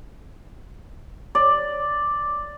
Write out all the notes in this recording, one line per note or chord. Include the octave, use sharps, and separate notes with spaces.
D5